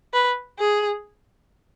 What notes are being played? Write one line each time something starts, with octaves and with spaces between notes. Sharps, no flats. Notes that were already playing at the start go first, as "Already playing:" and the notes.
B4
G#4